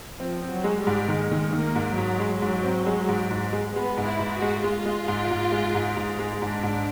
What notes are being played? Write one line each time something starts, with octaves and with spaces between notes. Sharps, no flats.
F3 C4
C4
F#3
G#3
G3
G#2
D#3 G#3
D#3
D#3 A#3
G#2
G#2 F#3
G#3
G#2
C4
G#3
G#2
G#2
G#3
G#3 B3
G#2
E4
G#2
F#4
G#3
G#3 F4
G#3
G#2
G#2
G#3
G#2
G#2
G#3
G#2 D4
G#2